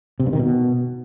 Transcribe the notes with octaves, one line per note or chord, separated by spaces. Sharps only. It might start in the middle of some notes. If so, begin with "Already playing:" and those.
C3
G2
D#3
B2